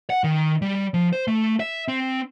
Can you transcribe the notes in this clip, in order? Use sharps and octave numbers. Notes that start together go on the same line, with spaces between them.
F#5
D#3
G3
F3
C5
A3
E5
C4